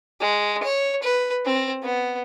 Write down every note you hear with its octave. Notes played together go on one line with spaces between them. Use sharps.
G#3
C#5
B4
C4
B3